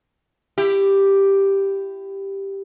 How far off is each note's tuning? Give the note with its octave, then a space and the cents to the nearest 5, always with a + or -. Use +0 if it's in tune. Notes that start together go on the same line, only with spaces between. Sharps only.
E4 +20 G4 +0